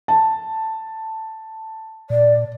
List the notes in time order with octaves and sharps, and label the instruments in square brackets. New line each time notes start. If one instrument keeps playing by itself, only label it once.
[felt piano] A5
[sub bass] A#2 [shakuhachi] D5